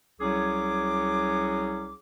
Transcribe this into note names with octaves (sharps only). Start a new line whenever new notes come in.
C2 F#3 C#4 G#4 D6